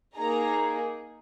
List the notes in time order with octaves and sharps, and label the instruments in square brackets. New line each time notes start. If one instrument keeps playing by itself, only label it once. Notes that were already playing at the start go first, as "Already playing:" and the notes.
[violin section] A#3 D#4 G#4 A#5